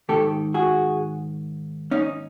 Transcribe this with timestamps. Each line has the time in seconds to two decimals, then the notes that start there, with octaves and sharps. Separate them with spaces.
0.09 G#2 D#3 G4 A4
0.54 F#4 G#4
1.91 C#4 D#4